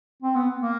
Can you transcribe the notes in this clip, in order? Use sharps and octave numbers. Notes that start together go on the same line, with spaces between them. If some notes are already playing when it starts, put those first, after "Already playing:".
C4
B3
A#3